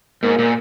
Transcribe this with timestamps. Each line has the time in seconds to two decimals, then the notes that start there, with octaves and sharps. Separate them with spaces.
0.23 G#2 A#3
0.39 A#2